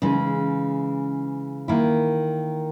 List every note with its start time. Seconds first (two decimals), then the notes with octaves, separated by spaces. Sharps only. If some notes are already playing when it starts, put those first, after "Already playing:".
0.02 C#3 E3 G#3 D#4
1.68 D#3 A#3 E4